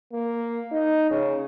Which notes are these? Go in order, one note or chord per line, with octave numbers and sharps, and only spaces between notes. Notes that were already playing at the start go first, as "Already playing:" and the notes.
A#3
D#4
C#3